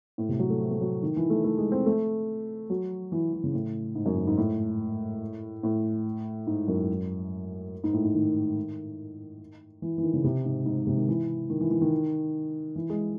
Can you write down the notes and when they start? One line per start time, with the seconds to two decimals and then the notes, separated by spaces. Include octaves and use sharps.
0.18 A2
0.29 C3
0.39 F#3
0.50 A3
0.61 C4
0.71 A3
0.81 F#3
1.02 D#3
1.16 E3
1.30 A3
1.44 A3
1.58 G#3
1.72 C4
1.86 A3
2.70 F#3
3.12 E3
3.33 E3
3.44 C#3
3.54 A2
3.95 G#2
4.06 F#2
4.17 G#2
4.27 G#2
4.37 A2
5.63 A2
6.47 G#2
6.68 F#2
7.84 G#2
7.93 A2
8.04 G#2
8.15 D#3
9.82 E3
9.98 E3
10.03 D#3
10.13 C#3
10.24 C3
10.45 G#2
10.66 G#2
10.77 G#2
10.87 C3
10.97 D#3
11.08 E3
11.50 D#3
11.60 E3
11.71 E3
11.81 D#3
12.76 E3
12.90 G#3